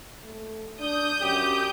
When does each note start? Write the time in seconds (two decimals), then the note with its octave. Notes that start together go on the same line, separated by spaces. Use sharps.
0.24 A3
0.80 D4 D#6 G6
1.21 F#2 G4